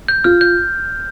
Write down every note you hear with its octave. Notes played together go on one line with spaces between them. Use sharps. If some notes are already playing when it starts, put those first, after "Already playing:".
G6
F4 F6
G6